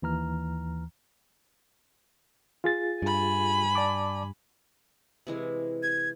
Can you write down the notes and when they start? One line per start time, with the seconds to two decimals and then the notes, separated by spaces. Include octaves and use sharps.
0.02 D#2 E3 A#5 F6
2.64 F4 G#4 A6
3.02 G2 G#5 B5
3.75 D5 A5 D6
5.27 C3 E3 G#3
5.83 G#6